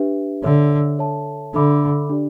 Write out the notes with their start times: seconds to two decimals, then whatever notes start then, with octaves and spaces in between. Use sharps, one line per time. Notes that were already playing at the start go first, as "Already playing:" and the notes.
Already playing: D4 G4 B4 E5
0.43 D3 A4 C#5 E5
0.99 A4 C#5 E5 A5
1.54 D3 D4 A4 E5 B5 D6
2.09 D4 G4 D5